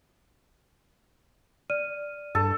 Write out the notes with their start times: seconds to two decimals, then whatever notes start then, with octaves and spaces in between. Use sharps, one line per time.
1.70 D5 F6 D#7
2.35 G2 A4